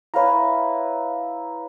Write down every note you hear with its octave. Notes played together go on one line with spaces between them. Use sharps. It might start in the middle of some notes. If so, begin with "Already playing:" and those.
E4 B4 C#5 F5 A#5